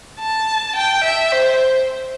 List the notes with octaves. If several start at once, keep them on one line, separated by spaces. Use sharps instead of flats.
A5
G5
E5
C5